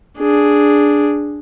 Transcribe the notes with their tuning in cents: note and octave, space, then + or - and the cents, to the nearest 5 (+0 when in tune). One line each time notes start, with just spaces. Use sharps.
D4 +0 G#4 +0